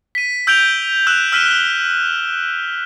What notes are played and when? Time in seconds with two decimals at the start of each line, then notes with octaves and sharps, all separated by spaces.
0.15 B6 D#7
0.47 E6 G6 G#6 D7 F7 G7
1.07 E6 F#6 G6 E7 F7
1.32 E6 F6 B6 D#7 E7 G7